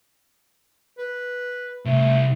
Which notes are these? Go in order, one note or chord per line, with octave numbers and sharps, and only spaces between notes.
B4
C2 A3